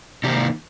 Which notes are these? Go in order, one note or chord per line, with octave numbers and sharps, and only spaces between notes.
C3 D#3 A#3 D#4 G4